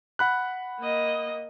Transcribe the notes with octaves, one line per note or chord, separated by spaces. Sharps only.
F#5 B5 F#6
A#3 D#5